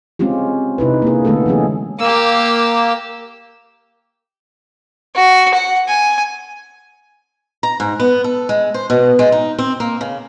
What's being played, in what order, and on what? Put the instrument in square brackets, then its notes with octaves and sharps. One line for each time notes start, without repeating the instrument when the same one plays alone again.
[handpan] G#3 C4 C#4 F4 G4
C3 D#4 E4 B4
A#3 D4 G#4
D3 G#3 A3 B3 G4 A4
E3 F#3 G#3 C#4 G#4
[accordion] A#3 [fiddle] G4 E6
[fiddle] F#4
F#5
G#5
[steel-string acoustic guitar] A#5
G#2
B3
A4
G#3
C5
B2
G#3
D#4
C4
A#3
C#3